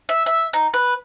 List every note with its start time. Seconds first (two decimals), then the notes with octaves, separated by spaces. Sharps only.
0.09 E5
0.26 E5
0.53 D#4
0.74 B4